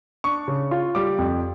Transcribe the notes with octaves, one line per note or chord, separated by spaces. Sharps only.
D4 C#6
C#3
F4
G3 D6
F2